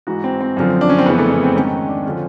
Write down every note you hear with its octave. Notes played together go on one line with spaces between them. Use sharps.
G#2 E3 F#4
C4
C4
F#2 D3 F3
D4
C#4
C4
F2 C#3 E3 B3
A3
B3
C4
G#2 D#3 C#4
D4
D3 F3 C#4